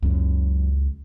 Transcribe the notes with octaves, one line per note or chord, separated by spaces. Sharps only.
C#2 F#2